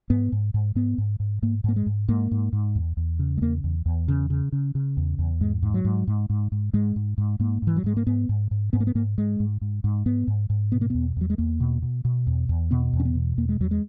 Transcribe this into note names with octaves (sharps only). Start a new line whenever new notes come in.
G#2 B3
G#2
G#2
G#2 B3
G#2
G#2
G#2 A#3
G#2 A#3
G#3
G#2
G#2 A#3
G#2
G#2
E2
E2
C#3
G#3
E2 A#3
E2
E2
C#3
C#3
C#3
C#3
E2
E2
G#2 G#3
G#2
F#3
G#2
G#2
G#2
G#2
G#2 G#3
G#2
G#2
G#2 A#3
G#2 E3
F#3
G#2 G#3
A#3
G#2 B3
G#2
G#2
G#2 B3
A#3
B3
G#2 A#3
G#2 G#3
G#2
G#2
G#2
G#2 B3
G#2
G#2
B2 B3
A#3
E2 B3
E2 F#3
G#3
E2 A#3
B2
B2
B2
E2
E2
B2 B3
E2
C#4
B3
B2
E2 A#3
G#3
E2 F#3
G#3